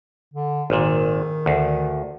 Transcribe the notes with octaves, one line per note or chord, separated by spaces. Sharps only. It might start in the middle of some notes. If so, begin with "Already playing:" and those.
D3
G#1 A#2 D#3
D2